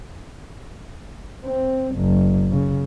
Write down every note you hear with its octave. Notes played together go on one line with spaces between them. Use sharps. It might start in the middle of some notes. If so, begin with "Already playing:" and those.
C4
F#1
C#3